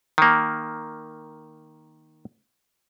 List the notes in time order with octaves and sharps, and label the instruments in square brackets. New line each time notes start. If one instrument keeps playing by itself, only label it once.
[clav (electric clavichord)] D#3 A#3